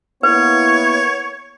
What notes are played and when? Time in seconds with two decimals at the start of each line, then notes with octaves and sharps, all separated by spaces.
0.23 A#3 B3 E4 B4 C#5